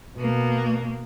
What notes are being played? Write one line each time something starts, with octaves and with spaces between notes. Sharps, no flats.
B2 A#3